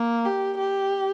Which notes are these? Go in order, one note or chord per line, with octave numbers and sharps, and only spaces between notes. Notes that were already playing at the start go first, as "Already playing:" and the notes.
Already playing: A#3
G4
G4